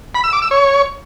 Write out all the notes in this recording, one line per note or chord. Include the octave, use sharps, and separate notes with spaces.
B5
E6
D6
E6
C#5